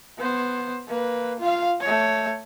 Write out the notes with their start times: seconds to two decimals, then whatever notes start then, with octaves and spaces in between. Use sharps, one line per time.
0.18 B3 C5
0.88 A#3 B4
1.40 F4 F5
1.81 A3 C#5